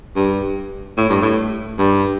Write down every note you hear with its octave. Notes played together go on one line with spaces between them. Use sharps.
G2
A2
G2
A2
G2